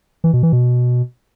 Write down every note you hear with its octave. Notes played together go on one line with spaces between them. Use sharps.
E3
B2
E3
B2